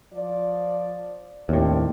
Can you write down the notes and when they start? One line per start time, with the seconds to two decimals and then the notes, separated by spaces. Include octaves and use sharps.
0.14 F3 D5
1.49 D#2 A2 C4 D4 G4